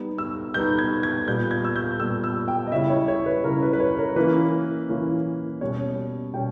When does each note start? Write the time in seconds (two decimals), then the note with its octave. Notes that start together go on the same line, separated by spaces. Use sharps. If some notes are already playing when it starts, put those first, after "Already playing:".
Already playing: G3 B3 D#4
0.18 E6
0.54 G3 B3 D#4 G6
0.78 G#6
1.03 G#6
1.27 A#2 G3 B3 G6
1.51 G#6
1.64 E6
1.76 G6
1.99 A#2 G3 B3 E6
2.24 E6
2.48 G5
2.67 D#5
2.71 C#3 G3 C#4 E4 E5
2.90 C#5
3.08 C#5
3.26 B4
3.44 C#3 G3 C#4 E4 A#4
3.62 B4
3.73 B4
3.80 C#5
3.99 A#4
4.16 E3 A#3 C#4 B4
4.89 E3 A#3 C#4
5.61 B2 G3 C#4 C#5
6.33 B2 G3 C#4 G5